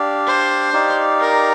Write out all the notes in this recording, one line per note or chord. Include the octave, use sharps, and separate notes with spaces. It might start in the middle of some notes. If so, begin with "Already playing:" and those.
Already playing: D4 G4 D5 F5
C5
D#4 G4 D5 F5
A#4